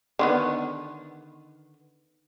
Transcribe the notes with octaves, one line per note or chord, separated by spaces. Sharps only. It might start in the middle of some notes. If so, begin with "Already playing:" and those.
D3 D#3 B3